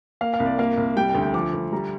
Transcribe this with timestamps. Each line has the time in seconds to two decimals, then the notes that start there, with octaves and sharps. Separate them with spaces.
0.21 A#3 F5
0.34 F5
0.40 C2
0.46 D5
0.59 A#3 F5
0.77 C2
0.96 G3 G5
1.09 G5
1.15 D2
1.22 G5
1.34 F3 D6
1.54 D2
1.72 G3 A#5